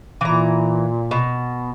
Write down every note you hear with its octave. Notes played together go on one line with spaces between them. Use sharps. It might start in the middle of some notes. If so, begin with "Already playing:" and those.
A#2 E3 A#5
B2